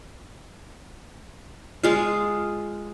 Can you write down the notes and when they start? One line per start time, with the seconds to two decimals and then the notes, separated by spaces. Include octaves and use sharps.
1.83 G#3 F4